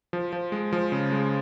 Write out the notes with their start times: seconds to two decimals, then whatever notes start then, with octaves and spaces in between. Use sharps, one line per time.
0.13 F3
0.33 F3
0.52 G#3
0.73 F3
0.92 C#3
1.12 G#3